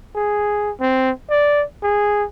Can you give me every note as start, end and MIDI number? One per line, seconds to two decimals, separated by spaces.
0.15 0.72 68
0.81 1.11 60
1.30 1.64 74
1.83 2.25 68